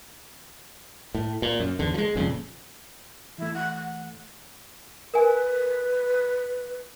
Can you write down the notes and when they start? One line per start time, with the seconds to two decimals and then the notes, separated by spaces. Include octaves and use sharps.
1.15 A2
1.42 A#2
1.60 F#2
1.79 E2 D3
1.94 F3 G#3
2.15 F1 F2 A#2 C#3
3.38 E3 A3 E4
3.54 F#5
3.75 F#5
5.14 A#4 B4 G#5